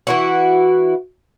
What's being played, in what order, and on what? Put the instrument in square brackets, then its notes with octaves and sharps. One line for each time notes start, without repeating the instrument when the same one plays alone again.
[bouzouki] E3 E4 F#4